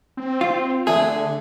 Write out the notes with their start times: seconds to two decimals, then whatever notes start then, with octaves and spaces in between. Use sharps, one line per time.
0.17 C4
0.41 F4
0.87 D3 A3 G#4